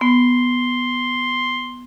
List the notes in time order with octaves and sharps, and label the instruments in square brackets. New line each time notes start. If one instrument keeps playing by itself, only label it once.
[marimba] B3 [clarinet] C6